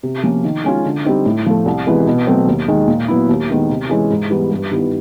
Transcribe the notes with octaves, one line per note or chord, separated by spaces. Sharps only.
C3
F3 A#3 C#4
D#3
G#3 C#4 F4
D3
G3 C4 D#4
A2
F3 A3
C2
C3 E3 G#3 B3
B2
F#3 A3 C4
D#2
D#3 G#3
A#2
F#3 B3 E4
D#2
D#3 G#3 B3 D#4
C3
E3 G#3 C#4 E4
G#2
E3 G3 B3 E4
G2
D#3 G3 B3 E4